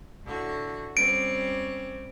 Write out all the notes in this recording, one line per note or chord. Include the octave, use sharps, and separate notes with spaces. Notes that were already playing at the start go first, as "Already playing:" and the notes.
A2 D3 F#4
G3 C4 C#4 D7